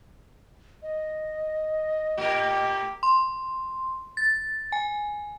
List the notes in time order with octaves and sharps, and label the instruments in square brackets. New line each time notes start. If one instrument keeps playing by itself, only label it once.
[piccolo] D#5
[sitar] A2 A#4 [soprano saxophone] G4
[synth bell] C6
A6
G#5